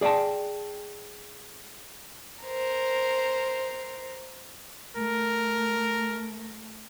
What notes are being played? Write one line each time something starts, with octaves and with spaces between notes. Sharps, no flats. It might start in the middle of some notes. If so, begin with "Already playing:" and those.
G#4 D5 D#5 G5 A5
A#4 C5
A3 A#4